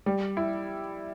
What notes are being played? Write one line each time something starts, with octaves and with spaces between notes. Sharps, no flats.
G3
E4